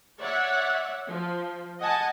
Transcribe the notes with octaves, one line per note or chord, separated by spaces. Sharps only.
C#5 D5 E5 F#5
F3
D#5 F#5 G#5 A5